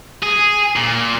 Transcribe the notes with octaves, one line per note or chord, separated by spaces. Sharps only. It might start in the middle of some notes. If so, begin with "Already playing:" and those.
G#4
A#2